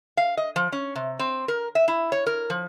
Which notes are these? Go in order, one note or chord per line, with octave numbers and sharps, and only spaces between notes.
F5
D#5
F3
C#4
C3
C4
A#4
E5
E4
C#5
A#4
F3